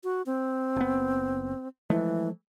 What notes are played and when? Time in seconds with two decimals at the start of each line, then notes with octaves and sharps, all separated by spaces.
0.04 F#4
0.26 C4
0.76 F#1 B3
1.90 E3 F3 G#3 A3